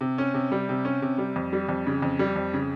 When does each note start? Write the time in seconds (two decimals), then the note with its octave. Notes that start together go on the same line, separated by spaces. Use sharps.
0.01 C3
0.18 C#4
0.34 C3
0.52 G3
0.69 C3
0.85 C#4
1.02 C3
1.18 G3
1.36 F2
1.53 G3
1.69 F2
1.87 C#3
2.02 F2
2.19 G3
2.36 F2
2.54 C#3